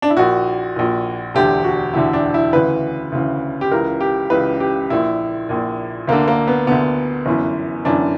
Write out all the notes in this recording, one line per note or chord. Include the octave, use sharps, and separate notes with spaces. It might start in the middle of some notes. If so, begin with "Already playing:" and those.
D4
E4
A#1 A#2 F#4
A#1 A#2
E1 D2 D3 G4
F#4
E1 D2 D3 E4
D4
E4
D2 C#3 E3 B4
D2 C#3 E3
G4
C#2 C#3 E3 A#4
G4
C#2 C#3 E3 B4
G4
A#1 A#2 E4
A#1 A#2
D2 D3 A#3
A#3
B3
D2 D3 B3
G1 F#2 E3
G1 F#2 E3 D4